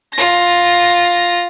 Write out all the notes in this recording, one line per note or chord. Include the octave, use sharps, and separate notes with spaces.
F4 A#6